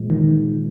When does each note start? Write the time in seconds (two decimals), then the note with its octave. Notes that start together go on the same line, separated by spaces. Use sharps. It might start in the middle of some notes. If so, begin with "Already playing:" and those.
Already playing: A#2 F3 G#3
0.10 D#3